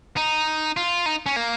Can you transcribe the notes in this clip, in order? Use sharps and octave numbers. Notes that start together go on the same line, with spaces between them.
D#4
F4
D#4
C#4
A#3